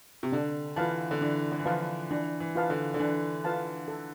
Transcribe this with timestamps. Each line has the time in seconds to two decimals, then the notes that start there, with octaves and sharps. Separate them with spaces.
0.23 C3
0.32 D3 D4
0.76 E3 F4 B4 F5 A5
1.11 D3
1.21 E3 D4
1.52 D3
1.59 E3
1.65 F3 F4 B4 F5 A5
2.11 E3 D4
2.40 E3
2.55 F4 B4 F5 A5
2.70 D3
2.94 D3
2.99 E3 D4
3.44 F4 B4 F5 A5
3.88 A4